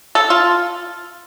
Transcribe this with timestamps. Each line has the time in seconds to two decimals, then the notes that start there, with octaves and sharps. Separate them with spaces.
0.15 A4
0.30 F4